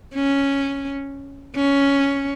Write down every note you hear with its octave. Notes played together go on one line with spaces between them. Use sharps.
C#4
C#4